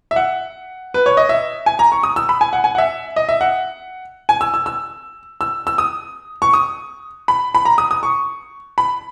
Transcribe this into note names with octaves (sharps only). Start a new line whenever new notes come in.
E5
F#5
B4
C#5
D#5
E5
G#5
A#5
C#6
D#6
E6
B5
G#5
F#5
G#5
F#5
E5
D#5
E5
F#5
G#5
E6
E6
E6
E6
E6
D#6
C#6
D#6
B5
B5
A#5
D#6
D#6
C#6
B5